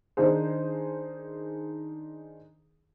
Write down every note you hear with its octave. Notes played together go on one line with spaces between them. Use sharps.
D#3 D4 D#4 G#4 C5